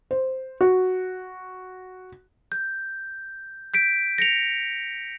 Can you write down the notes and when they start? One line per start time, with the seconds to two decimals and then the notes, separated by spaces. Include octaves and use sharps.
0.11 C5
0.61 F#4
2.52 G6
3.74 G6 B6 D7
4.18 A#6 C#7 F7